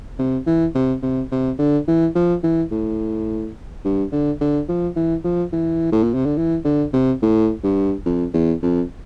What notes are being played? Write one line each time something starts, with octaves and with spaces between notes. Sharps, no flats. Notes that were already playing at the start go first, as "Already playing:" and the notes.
C3
E3
C3
C3
C3
D3
E3
F3
E3
A2
G2
D3
D3
F3
E3
F3
E3
A2
A#2
C3
D3
E3
D3
C3
A2
G2
F2
E2
F2